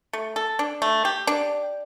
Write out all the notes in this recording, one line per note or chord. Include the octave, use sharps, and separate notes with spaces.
A3
A4
D4
A3
G4
D4